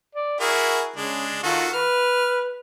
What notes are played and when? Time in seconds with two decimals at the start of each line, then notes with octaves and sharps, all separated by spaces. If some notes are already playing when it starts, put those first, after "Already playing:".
0.15 D5
0.40 E4 F#4 G#4 A#4
0.96 C#3 G#3 D4
1.43 D#3 F4 F#4 A4
1.73 B4 F6